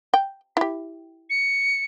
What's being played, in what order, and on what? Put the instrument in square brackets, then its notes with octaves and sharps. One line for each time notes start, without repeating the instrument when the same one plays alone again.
[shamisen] G5
E4 G4
[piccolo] C#7